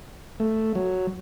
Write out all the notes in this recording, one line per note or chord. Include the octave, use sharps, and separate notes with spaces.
A3
F#3